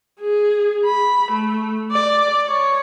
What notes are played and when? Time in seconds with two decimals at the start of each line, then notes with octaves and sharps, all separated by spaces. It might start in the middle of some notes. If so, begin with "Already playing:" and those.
0.21 G#4
0.86 B5
1.32 A3
1.91 D5
2.48 C#5